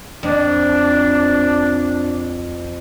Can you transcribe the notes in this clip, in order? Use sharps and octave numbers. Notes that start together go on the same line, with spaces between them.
F2 D4